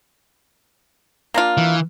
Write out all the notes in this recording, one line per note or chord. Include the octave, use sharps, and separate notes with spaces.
A#3 D4 F4
E3